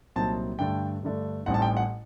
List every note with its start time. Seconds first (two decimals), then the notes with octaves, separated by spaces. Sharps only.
0.16 C2 A#2 F#3 C4 D#4 A5
0.59 G2 D3 A3 D4 G5
1.03 G2 D3 A3 D4
1.46 A1 A2 G3 C4 D#4 F#5
1.54 A5
1.62 G5
1.77 F#5